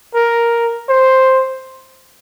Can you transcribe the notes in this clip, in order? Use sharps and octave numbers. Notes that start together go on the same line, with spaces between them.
A#4
C5